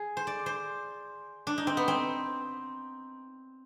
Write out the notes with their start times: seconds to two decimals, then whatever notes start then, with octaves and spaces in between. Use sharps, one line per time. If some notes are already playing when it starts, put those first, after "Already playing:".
Already playing: G#4
0.17 C5
0.27 D5
0.46 C5
1.47 D4
1.58 D#4
1.67 C4
1.77 B3
1.88 C4